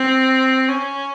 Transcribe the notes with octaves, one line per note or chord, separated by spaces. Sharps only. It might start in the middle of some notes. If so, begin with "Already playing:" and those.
Already playing: C4
C#4